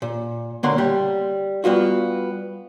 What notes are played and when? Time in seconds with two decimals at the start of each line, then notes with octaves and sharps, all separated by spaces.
0.02 A#2
0.63 C#2 B2 D3 A#3 F#5 C6
0.78 G3
1.64 G3 B3 F4 F#4